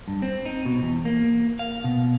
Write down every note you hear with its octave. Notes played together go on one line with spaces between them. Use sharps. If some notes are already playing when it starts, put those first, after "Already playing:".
G2
C4
D#4
B2
E2
A#3
F5
B2